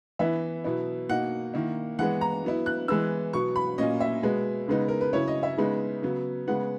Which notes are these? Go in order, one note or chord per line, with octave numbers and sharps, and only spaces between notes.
E3 B3 E4 E5
B2 F#3 B3 E4
B2 A#3 D#4 F#5
D#3 A#3 E4
E3 G#3 B3 F#5
A#5
F#3 B3 E4
F#6
E3 G#3 B3 E6
B2 F#3 B3 C#6
B5
A#2 F#3 A#3 C#4 D#5
E5
B2 G#3 B3
C#3 G#3 B3 D#4
A#4
B4
C#3 F#3 C#4 E4 C#5
D#5
E5
C#3 G#3 B3 D#4
C#3 F#3 B3
C#3 G#3 B3 F#5